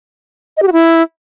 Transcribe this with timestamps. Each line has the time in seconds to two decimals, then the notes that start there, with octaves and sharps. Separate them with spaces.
0.57 D#5
0.62 G4
0.67 F#4
0.72 E4